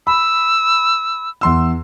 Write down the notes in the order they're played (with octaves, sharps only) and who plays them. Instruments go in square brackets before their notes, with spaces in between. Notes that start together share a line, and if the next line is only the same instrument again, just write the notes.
[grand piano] B5 [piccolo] E6
[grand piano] E2 C6 E6